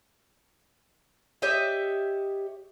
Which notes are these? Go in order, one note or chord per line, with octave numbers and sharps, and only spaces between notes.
G4 C#5 D#5 E5